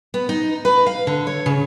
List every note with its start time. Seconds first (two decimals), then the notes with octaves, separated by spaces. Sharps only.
0.14 B3
0.29 D#4
0.65 B4
0.86 F5
1.07 D3
1.27 C#5
1.46 C#3